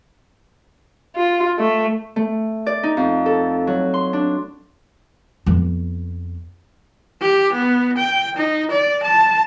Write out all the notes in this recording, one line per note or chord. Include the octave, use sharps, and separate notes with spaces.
F4
A3
A3
D5
D#4
F2
A4
F#3
C6
D4
F2 B3
G4
B3
G5
D#4
D5
A5